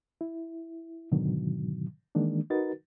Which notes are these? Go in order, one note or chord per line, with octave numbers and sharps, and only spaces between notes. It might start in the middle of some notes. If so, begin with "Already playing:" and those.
E4
G#2 B2 D3 D#3 F#3
D#3 E3 G#3 A#3 D4
D#4 F#4 A#4 B4 A6